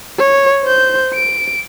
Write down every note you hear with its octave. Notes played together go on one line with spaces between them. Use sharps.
C#5
C5 G6
D7